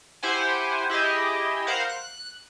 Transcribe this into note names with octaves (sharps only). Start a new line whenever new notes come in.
E4 G4 C5 F#5 G#5
E4 G4 G#4 D#5
A#4 C5 F5 F#5
F#6